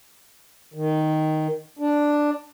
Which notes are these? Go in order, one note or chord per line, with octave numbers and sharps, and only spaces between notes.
D#3
D4